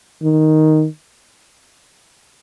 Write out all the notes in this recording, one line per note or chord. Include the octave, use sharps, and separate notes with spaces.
D#3